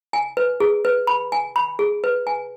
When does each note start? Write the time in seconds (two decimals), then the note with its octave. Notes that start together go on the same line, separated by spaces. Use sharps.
0.13 G#5
0.37 B4
0.60 G#4
0.85 B4
1.07 B5
1.32 G#5
1.56 B5
1.79 G#4
2.04 B4
2.27 G#5